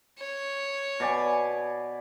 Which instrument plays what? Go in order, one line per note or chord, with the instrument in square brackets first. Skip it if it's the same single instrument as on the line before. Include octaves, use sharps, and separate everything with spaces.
[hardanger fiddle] C#5
[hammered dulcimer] B2 D5 G#5